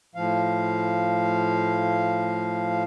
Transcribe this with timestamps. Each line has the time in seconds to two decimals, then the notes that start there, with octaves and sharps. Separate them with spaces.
0.15 A2 F3 F5